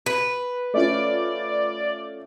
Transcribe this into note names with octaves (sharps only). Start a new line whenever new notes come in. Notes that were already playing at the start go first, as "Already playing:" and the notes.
B4
A3 C#4 F4 D5